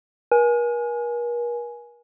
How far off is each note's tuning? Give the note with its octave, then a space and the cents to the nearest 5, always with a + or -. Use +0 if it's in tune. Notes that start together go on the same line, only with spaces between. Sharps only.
A#4 +45 G#5 +10